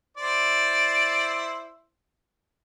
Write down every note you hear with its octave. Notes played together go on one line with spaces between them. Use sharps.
E4 C5 D5